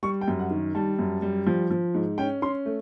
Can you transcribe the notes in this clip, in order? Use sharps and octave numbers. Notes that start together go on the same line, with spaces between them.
G3 C#6
G5
F#2
F#5
D#3
G3 A5
F#2
G3
F3
F3
G#2
C#4 G5
C#4 C6
A3